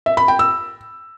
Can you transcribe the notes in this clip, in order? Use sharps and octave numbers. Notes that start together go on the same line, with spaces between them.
E5
B5
G5
E6